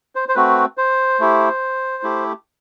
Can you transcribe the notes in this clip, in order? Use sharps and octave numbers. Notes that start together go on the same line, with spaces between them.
C5
C5
A3 C4 F#4 B4
C5
A3 E4 G4
A3 E4 G4